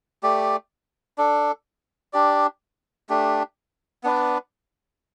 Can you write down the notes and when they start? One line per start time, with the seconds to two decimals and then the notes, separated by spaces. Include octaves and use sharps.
0.23 A3 G4 D5
1.18 D4 A4 D5
2.13 D4 G4 D5
3.09 A3 D4 G4
4.04 B3 D4 B4 D5